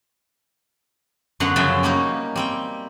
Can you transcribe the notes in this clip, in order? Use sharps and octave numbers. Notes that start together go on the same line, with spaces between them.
F#2 D3 B3 F#5 A#5 C6
F#2 C#3 F3 E5 G5 G#5
G3 A#3 C#4 D#4
G3 C4 G5